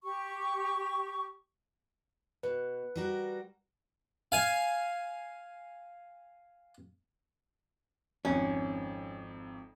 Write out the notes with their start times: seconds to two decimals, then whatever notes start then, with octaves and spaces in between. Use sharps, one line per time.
0.03 G4 C#6
2.43 B2 B4
2.96 G3 F#4 A#4
4.32 F5 G#5
8.25 G#1 F2 C#4